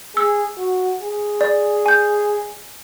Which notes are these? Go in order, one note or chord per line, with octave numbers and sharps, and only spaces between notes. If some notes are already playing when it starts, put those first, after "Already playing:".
G#4 E6
F#4
G#4
D5
G#5 G6